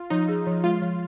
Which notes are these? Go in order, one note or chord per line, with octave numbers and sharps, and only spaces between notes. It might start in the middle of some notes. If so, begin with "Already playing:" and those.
Already playing: F4
F3 D#4
G#4
F3
G#3 F4
F3